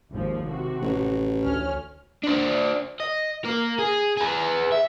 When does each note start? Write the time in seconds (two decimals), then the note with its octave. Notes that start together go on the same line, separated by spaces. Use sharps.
0.11 G#1 D#2 F3
0.46 C3 F#4
0.82 A1
1.42 D2 C#4 F6
2.24 D4 C5
3.00 D#5
3.45 A#3 A#4
3.79 G#4
4.17 G#4 B4
4.72 E5